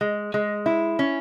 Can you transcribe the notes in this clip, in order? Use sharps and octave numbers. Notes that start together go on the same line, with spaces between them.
G#3
G#3
E4
C#4